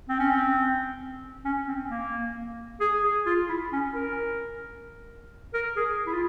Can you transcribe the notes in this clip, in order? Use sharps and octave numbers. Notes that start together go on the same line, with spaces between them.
C4
C#4
C4
C#4
C4
A#3
G#4
G#4
F4
E4
C#4
A#4
A#4
G#4
E4
F4